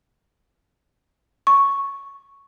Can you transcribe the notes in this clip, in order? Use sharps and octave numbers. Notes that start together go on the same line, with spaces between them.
C#6